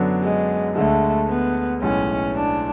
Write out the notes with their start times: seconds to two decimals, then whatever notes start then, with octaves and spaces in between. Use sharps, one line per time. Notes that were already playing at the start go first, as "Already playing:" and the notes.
Already playing: F#2 D3 F#3 B3 D4
0.23 G#3
0.76 D2 D3 G#3 A3
1.29 B3
1.82 B1 A2 G#3 C#4
2.36 D4